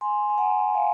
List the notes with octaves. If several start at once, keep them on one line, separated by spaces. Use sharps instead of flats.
G#5 C6
G#5
F#5 A#5
F5 G#5